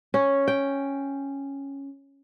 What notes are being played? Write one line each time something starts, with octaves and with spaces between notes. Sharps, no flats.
C#4
G5